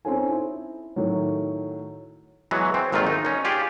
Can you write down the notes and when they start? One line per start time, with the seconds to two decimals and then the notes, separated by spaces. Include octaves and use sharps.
0.05 C4 C#4 D#4 A4 C5 G#5
0.29 E4
0.96 A2 D#3 F#3
2.51 E3 F#3 G#3 B3 F#4
2.74 C4
2.92 G#1 A#2 D#3 F#3 A3 F4
3.07 D#4
3.25 C#4 D#4
3.45 F4 G4 G#4 D5